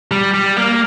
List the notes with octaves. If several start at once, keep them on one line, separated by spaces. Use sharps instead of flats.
G3
G3
A#3